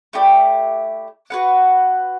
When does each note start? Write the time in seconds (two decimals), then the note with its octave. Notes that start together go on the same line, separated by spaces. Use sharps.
0.13 A3 E4 G4 D5
1.30 F#4 B4 F#5